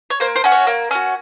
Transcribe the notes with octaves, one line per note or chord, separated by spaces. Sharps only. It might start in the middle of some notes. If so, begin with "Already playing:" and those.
C#5
A#3 C5
C5
C#4 F#4
C#5
A#3
C#4 F#4